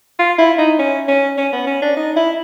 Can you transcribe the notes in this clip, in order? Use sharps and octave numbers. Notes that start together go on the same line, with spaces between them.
F4
E4
D#4
C#4
C#4
C#4
B3
C#4
D4
D#4
E4